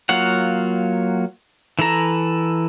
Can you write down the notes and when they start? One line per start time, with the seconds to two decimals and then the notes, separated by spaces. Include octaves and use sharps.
0.09 F#3 A#3 F4 C#5 F#5
1.79 E3 E4 A4 A#5